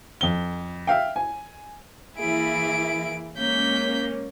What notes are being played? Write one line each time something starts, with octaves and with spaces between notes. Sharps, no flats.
F2 G7
E5 F5 G5
G#5
E3 A#3 E4 G#4 D7
G#3 A#3 C#4 G6 B6